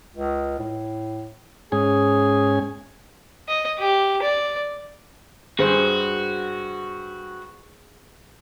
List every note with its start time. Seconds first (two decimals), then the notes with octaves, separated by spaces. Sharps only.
0.15 C#2
0.59 A2
1.72 G#2 C#4 G#4 G#5
3.48 D#5
3.79 G4
4.22 D5
5.59 G2 F#4 G#4 C5